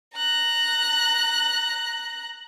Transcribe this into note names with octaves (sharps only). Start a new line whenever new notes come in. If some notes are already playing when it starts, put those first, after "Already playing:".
A#5 F#6